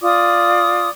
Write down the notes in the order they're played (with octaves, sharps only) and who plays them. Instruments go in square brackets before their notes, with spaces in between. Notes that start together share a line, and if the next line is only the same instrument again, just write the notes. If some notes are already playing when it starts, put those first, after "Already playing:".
[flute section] F4 D5 D6 D#6